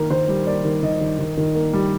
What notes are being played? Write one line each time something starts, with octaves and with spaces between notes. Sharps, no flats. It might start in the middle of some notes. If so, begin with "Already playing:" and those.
Already playing: D#3 A#3 A#4
D#3 C5
G3
A#3 D5
D#3
D#3 D#5
D#3
D#3
D#3
A#3
G3